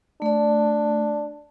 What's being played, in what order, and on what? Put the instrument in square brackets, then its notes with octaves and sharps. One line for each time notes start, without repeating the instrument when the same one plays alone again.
[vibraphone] A3 D5 [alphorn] D4